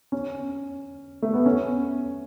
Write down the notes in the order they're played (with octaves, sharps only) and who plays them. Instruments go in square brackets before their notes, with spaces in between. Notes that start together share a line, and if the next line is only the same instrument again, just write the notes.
[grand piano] C#4
A3
B3
C#4